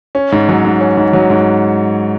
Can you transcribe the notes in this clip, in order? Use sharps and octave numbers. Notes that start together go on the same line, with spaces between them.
C#4
G#2
F#3
G#2
C#4
G#2
F#3
G#2